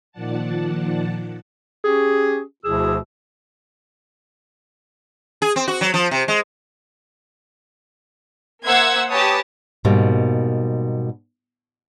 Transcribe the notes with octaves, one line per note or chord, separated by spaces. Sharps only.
A#2 D#3 F3 D5 F#5 A5
C#4 G4 G#4
D2 B2 F3 E4 G#4 E6
G#4
C4
F#4
F#3
F3
C3
G#3
A#3 C5 E5 F#5 E6 G#6
G4 B4 C#5 G#5 A5 D#6
G#2 B2 G3 A#3